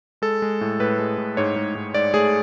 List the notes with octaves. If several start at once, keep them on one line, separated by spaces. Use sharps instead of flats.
G#3 A4
G#3
A2
A2 B4
G#3
A2
G#2 C#5
G#2
G#2
G#2 D5
A3 G#4